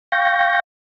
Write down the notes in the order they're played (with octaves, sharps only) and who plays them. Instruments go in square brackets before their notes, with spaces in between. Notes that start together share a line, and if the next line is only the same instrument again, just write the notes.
[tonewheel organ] F5 G5 C#6 G6 A#6